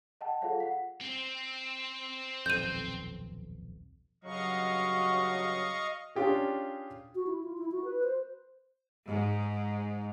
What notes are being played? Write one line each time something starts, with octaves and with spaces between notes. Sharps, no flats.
D#5 F#5 G5 A5
F4 G#4 A4 C#5 F5 F#5
F#5 B6
C4
D#1 B1 F2 G6 D#7
G2 C#3 F#3 D#5 F5 C#6
C#4 D4 F4 G4 G#4
F#4
E4
F4
E4
F#4
B4
C5
G#2